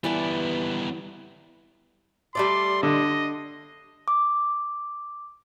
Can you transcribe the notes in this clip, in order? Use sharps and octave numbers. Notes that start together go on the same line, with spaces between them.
E3 G3 B3 D5 A5
G3 A3 D5 C6
D3 D#5
D6